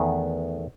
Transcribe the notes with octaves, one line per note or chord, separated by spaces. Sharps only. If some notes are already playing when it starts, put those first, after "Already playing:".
Already playing: E2 D#3 A3 B3